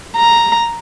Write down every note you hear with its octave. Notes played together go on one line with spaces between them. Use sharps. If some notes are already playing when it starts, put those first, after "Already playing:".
A#5